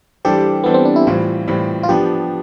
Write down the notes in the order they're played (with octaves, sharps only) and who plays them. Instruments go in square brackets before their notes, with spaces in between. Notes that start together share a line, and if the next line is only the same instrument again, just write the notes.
[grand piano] E3 G3 D4 A4 C5 [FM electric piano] G4
[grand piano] E3 G3 D4 A4 C5 [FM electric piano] B3
[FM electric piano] C4
D4
E4
[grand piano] A2 E3 G3 C4 [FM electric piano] F4
[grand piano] A2 E3 G3 C4
[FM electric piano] F4
[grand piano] F3 B3 D4 [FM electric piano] G4